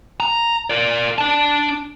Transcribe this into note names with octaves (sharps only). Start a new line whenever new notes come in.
A#5
A#4 D5
D4 A5